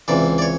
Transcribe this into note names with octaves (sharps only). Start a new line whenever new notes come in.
C#2 C3 E3 D5
D5
C#5